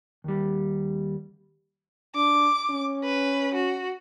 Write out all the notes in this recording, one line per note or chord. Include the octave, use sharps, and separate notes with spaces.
D#2 G3
D4 D6
C#4
B4
F#4